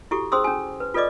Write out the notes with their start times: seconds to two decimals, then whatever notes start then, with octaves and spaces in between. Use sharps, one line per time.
0.11 E4 F#4 G4 A4 C#6
0.32 C#4 G#4 C5 C6 D#6 E6
0.44 C#4 G#5
0.80 B4
0.94 F4 A4 B4 D5 D#5 D6